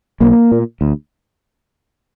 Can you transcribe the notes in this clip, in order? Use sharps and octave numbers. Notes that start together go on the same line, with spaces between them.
B1 A#3
A#2
D2